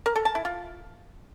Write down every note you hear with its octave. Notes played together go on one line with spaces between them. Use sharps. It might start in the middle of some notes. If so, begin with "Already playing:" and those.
A#4
A4
A5
E4
F4